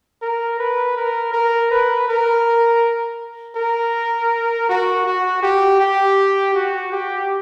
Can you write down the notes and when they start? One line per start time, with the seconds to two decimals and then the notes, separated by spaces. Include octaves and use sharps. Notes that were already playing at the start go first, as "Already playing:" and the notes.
0.22 A#4
0.59 B4
0.96 A#4
1.33 A#4
1.71 B4
2.08 A#4
3.56 A#4
4.69 F#4
5.06 F#4
5.43 G4
5.80 G4
6.54 F#4
6.92 G4